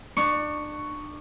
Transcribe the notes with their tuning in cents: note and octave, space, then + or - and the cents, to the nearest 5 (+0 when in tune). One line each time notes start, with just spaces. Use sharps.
D4 +30 C#6 +5